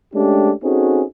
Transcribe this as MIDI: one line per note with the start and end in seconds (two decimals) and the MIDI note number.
0.14 0.52 56
0.14 0.52 57
0.14 0.52 61
0.14 0.52 62
0.14 0.52 67
0.63 1.03 60
0.63 1.03 61
0.63 1.03 63
0.63 1.03 66
0.63 1.03 68
0.63 1.03 69